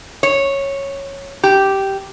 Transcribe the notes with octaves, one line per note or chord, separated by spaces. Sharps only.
C#5
G4